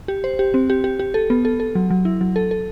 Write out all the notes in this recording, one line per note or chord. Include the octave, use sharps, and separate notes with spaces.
G4
C5
G4
C4
G4
G4
G4
A4
B3
A4
A4
F#3
F#3
E4
F#3
A4
A4